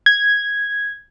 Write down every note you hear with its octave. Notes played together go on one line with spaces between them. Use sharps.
G#6